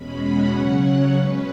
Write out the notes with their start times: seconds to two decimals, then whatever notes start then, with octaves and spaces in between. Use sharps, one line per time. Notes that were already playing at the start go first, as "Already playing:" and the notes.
Already playing: E2 B2 G#3 C#4 B5
0.21 F#5
0.52 C#3 F#3 C#4
0.82 C#5
1.14 B2 G#3 C#4 B4